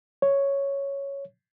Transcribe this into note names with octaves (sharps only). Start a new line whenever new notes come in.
C#5